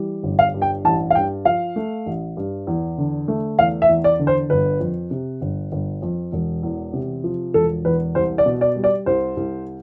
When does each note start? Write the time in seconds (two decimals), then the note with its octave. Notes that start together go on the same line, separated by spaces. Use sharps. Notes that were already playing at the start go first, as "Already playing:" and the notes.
Already playing: E3 G3
0.23 G1
0.39 F5
0.54 G2
0.62 G5
0.85 A1 A5
1.10 F5
1.15 G2 G5
1.45 F3 F5
1.76 A3
2.06 A1
2.37 G2
2.67 E2
2.98 D3
3.28 A3
3.58 E2 F5
3.82 E5
3.89 E2
4.04 D5
4.19 D3
4.27 C5
4.50 G1 B4
4.80 F2
5.11 C3
5.41 G1
5.72 G1
6.02 F2
6.32 E1
6.63 E2
6.93 C3
7.24 F3
7.54 E1 A4
7.85 E2 B4
8.15 C2 C5
8.38 D5
8.46 B2
8.61 D5
8.76 G3
8.84 D5
9.06 C2 C5
9.37 C2